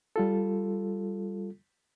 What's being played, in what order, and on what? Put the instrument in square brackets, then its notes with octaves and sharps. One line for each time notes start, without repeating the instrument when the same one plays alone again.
[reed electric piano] G3 F4 A4